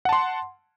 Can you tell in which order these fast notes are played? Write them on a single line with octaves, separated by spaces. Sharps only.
F#5 A5 C6